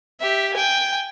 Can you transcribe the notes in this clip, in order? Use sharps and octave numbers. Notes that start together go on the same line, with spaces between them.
G4 E5
G5 G#5